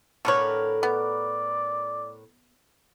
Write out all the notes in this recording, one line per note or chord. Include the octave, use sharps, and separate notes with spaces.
A2 D3 A#4 B4 C#5
B3 D5